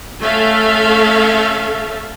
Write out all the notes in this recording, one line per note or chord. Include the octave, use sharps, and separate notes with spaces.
A3 C#4 A4 E5 F5